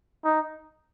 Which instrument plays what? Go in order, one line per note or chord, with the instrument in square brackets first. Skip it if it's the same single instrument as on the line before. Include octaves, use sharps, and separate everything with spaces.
[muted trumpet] D#4